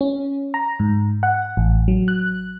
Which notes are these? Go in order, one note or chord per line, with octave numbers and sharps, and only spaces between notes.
C#4
A#5
G#2
F#5
A1
F#3
F#6